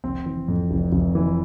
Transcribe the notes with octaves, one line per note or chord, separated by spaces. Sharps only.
F1 C4
E3
F2
F1
F1
E3